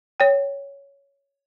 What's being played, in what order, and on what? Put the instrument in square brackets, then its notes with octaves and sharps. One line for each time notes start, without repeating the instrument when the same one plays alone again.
[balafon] C#5 G5